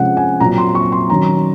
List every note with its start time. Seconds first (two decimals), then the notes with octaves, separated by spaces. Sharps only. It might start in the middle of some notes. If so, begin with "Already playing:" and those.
Already playing: C3 F3 G#3 C#4 F#5
0.17 G#5
0.40 A#2 F#3 C4 A#5
0.58 C6
0.75 C#6
0.92 C6
1.10 D#3 F#3 C#4 A#5